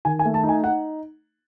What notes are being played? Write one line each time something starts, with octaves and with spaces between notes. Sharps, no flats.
D#3 G#5
G#5
A3
A5
D#4
G#5
D#4 F#5